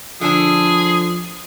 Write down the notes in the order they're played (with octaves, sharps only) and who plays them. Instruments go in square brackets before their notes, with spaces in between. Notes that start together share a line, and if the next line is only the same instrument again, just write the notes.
[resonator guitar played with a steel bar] D3 D4 [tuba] F3 [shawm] G#4